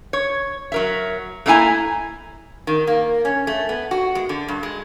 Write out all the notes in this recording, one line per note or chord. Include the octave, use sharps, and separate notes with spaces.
C#5
F#3 A#4 E5
A3 A#3 D4 E4 G#5 A#5
D#3
A#3
C#4
A3
B3
F#4
G#3
D3
G2
G#3